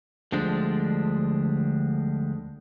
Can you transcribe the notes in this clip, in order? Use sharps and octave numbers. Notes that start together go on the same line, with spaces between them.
D2 D3 F3 G3 G#3 D4